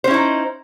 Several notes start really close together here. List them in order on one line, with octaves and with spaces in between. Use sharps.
C5 C#4 E4 D#4